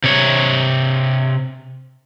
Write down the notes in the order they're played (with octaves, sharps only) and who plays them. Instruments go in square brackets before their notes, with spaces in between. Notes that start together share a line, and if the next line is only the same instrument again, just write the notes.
[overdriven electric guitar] C3 C#5